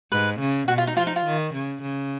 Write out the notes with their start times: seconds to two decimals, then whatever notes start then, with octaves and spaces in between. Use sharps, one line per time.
0.11 G#2 B4
0.40 C#3
0.68 B2 F#4
0.78 F4
0.87 D#4
0.96 F3 F4
1.07 D#4
1.16 F4
1.25 D#3
1.53 C#3
1.82 C#3